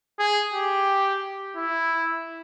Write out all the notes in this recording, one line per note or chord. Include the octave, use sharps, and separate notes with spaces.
G#4
G4
E4